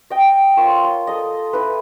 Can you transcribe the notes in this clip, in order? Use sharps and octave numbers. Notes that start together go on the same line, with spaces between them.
D#5 G5
F4 A#4 C#5
C6
A4 D#5
E4 B4